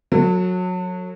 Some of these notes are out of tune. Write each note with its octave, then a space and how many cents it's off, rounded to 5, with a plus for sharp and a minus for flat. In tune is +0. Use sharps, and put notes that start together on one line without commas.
F#3 -20 A4 +35